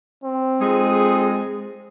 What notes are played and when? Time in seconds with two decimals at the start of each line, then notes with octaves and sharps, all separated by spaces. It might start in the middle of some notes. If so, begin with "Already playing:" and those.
0.24 C4
0.61 F2 G#3 D#4 G#4